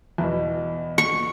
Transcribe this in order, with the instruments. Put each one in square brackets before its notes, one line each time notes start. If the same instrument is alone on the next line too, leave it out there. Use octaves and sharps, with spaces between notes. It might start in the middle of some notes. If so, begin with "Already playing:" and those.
[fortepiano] E2 B2
[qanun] C#6